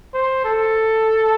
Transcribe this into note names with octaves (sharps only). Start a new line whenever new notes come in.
C5
A4